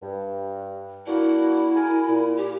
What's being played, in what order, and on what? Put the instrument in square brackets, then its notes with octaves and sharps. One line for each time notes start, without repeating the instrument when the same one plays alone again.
[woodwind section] G2
[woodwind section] A#3 D4 F#4 [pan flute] E4
[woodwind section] A#4 G#5
A#2
[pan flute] G4